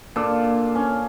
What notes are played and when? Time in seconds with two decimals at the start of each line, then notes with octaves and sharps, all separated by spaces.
0.16 A#2 D4 A4
0.75 C#4